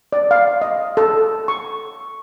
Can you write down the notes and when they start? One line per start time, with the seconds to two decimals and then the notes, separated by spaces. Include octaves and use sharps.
0.13 D5
0.31 F5
0.62 D#5
0.97 A4
1.48 C#6